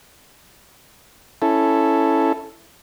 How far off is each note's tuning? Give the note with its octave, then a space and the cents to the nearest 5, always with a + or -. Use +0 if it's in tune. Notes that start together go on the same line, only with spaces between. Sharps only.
C#4 +0 E4 +0 A4 +0